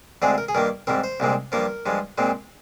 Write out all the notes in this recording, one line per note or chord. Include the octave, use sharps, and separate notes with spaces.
D2 D3 G#3 C4 G#4
A#4
G#4
G2 D#3 A#3 A#4
G#2 G3 C4 A#4
C5
C2 A#2 G#3 C4
G2 F3 A#3 A#4
G2 F3 G#3
A#2 G#3 C4